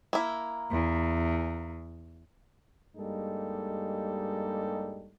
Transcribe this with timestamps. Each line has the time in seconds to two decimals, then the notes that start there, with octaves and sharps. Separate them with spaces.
0.13 A#3 E4
0.71 E2
2.96 G2 G3 G#3 A#3 D#4 A4